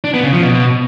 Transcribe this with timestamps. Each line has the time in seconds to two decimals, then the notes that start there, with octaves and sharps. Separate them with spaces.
0.04 D4
0.14 B3
0.24 C#3
0.33 F3
0.43 B2